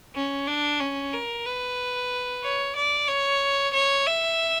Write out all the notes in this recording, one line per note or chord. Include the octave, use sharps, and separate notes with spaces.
C#4
D4
C#4
A#4
B4
C#5
D5
C#5
C#5
E5